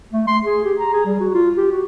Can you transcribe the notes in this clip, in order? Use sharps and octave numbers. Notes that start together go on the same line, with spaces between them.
A3
C6
G#4
G4
A#5
G#4
G3
F#4
F4
G4
F#4